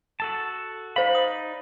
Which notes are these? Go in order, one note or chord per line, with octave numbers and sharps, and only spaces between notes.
F#4 A4 A5
D#4 C5 D5 F5 B5
D#6